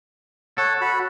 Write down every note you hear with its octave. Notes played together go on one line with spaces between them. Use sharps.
A4 C#5 F#5
F#4 B5